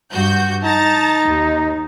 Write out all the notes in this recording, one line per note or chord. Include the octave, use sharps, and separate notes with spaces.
G2 F#4 G6
D#4 A5 A#5 A6
D#2